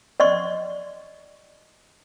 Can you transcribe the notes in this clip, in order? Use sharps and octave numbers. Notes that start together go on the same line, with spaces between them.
D5 D#5 C6 C#6